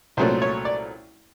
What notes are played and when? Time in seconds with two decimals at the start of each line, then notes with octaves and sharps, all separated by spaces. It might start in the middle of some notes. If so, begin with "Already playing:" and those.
0.17 C2 A#2 F#3 A3 C#4 C5
0.42 C#5
0.65 D5